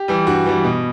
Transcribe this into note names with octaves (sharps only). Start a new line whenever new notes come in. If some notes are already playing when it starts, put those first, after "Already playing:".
Already playing: G4
E3 G3
G2 F#4
E3 G3
B2